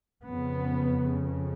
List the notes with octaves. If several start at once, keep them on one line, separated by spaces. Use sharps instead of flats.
F2 C#3 B3